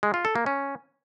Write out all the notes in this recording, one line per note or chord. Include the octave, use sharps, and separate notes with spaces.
G#3
F4
A4
A#3
C#4